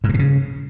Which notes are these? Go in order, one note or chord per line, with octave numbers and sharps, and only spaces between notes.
G#2
G2
B2
C#3